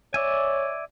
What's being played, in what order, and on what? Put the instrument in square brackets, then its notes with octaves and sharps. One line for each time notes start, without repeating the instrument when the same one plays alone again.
[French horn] C#5 [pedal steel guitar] D5 E5 G#5